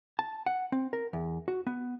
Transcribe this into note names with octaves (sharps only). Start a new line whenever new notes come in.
A5
F#5
C4
A#4
E2
F#4
B3